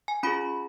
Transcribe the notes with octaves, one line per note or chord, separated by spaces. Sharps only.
G#5
C#4 F4 G#4 B5